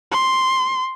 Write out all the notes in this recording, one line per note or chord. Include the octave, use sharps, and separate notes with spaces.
C6